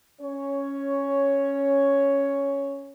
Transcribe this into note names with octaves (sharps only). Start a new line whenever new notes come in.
C#4 C#5